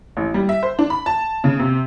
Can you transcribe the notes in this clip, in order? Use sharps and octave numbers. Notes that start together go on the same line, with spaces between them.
A1
G3
E5
C5
D4
B5
A5
C#3
C3